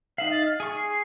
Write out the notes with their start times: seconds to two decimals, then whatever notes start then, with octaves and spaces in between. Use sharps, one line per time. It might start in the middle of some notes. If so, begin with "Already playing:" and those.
0.18 D#4 E5 F5 F#7
0.31 A6
0.46 F6
0.60 G#4 C#6
0.77 C7